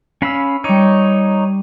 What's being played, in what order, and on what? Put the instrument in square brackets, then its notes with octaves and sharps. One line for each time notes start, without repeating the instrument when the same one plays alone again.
[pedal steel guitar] C#4 F5 B5 [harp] B4 E6
[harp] G3 D6 [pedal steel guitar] D#4 C#5